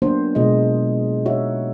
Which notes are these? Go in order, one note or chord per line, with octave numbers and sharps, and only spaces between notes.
F#3 A#3 B3 D4 F#4 C5
B2 G#3 F4 D#5
D#4 F#4 C#5 E5